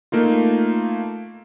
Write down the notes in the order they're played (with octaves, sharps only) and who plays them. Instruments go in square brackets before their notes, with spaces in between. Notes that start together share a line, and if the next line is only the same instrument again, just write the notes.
[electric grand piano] A3 A#3 D#4 F4